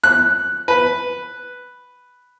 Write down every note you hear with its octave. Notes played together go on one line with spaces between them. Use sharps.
F#6
B4